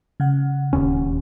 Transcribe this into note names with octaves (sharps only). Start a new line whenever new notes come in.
C#3 F#5
D1 D#2 C#4